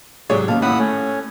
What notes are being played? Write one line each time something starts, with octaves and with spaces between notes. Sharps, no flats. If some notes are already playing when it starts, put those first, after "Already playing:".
G#2 C3 F#3 G#4 C#5 D5
D#2 B2 C#4 F5 A5
D#2 A2 E4 F#5 B5 D#6
A3 C#4